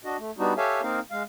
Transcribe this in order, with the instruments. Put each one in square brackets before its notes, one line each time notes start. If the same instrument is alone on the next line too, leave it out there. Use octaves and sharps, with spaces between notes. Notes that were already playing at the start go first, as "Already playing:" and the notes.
[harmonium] D4 F#4 D#5
A3
G3 B3 D4 D#4 F#4
G4 A4 C#5 E5 F5 G#5
A#3 C4 D#4 A#4 F5
G#3 F5